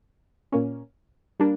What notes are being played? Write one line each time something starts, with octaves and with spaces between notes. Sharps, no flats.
A#2 A#3 C#4
G3 A#3 D4